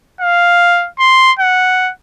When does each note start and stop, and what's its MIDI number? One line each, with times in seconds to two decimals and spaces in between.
0.20 0.88 77
0.99 1.31 84
1.39 1.91 78